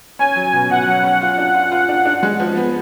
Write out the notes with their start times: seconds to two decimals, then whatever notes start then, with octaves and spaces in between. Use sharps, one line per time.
0.19 C#4 G#5
0.36 F#3
0.53 B2
0.70 B2 F#5
0.87 F#3
1.03 C#4
1.21 F4
1.38 D4
1.54 F4
1.72 F4
1.89 D4
2.05 D4
2.23 G#3
2.40 F3
2.56 B3